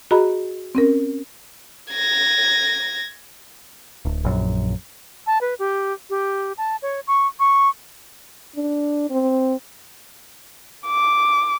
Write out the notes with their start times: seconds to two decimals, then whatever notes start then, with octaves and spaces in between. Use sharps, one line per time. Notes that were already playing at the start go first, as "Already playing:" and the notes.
0.11 F#4 G#4 D#5 A#5 B5
0.75 C4 C#4 A#4
1.92 G#6 A#6
4.05 D1
4.24 A#1 F#2
5.27 A5
5.41 B4
5.59 G4
6.10 G4
6.58 A5
6.82 C#5
7.07 C#6
7.40 C#6
8.56 D4
9.10 C4
10.87 D6